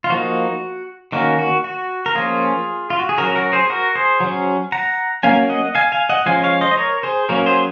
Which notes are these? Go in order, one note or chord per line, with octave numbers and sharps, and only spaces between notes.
F4
F3 A#3 D#4 F#4
D#3 A#3 C#4 F#4 A#4
F#4
F#4
A#4
F3 A#3 C#4 F4 G#4
F4
F#4
G#4
F#3 C#4 F#4 A#4
F#4 A#4
G#4 C5
F#4 A#4
G#4 C5
F#3 C#4
F#5 A#5
F#3 A#3 C#4 F5 G#5
D#5 F#5
F5 G#5
F5 G#5
D#5 F#5
F3 G#3 C#4 F5 G#5
C#5 F5
C5 D#5
D#5
A#4 C#5
G#4 C5
F#3 A#3 C#4 F#4 A#4
G#4 C5